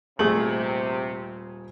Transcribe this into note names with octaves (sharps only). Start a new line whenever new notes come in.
D#1 C3 A3 G#4 F#7